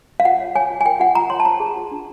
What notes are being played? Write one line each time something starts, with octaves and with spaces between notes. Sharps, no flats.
F5
F4 F#5
C#5
C#5 G#5
F4
G#5
A#4 G5
F4 F#5
F4 A#5
C#5 C6
A5
C5 A#5
G#4
F4
D4